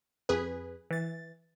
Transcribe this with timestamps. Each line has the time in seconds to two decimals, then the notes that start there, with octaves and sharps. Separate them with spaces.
0.29 F2 G#4 B4
0.91 E3 A6